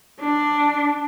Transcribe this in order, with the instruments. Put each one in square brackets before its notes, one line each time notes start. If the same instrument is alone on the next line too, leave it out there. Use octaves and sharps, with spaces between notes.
[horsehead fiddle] D4